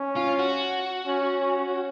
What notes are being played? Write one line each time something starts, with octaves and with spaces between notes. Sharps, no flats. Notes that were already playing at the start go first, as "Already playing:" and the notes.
Already playing: C#4
F4
F#4
C#4
C#4